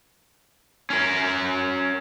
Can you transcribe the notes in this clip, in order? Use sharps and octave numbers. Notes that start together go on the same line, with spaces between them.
C#4 A#4